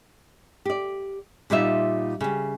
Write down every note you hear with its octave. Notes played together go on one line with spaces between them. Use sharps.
G4 D5
A#2 G3 D#4 F4 E5
C#3 G3